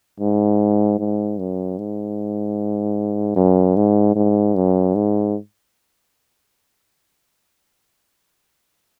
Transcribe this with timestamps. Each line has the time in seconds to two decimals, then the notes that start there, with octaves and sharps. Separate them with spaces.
0.20 G#2
0.99 G#2
1.39 F#2
1.78 G#2
3.36 F#2
3.76 G#2
4.15 G#2
4.55 F#2
4.95 G#2